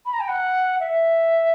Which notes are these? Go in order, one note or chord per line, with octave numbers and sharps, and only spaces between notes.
B5
A#5
G5
F#5
E5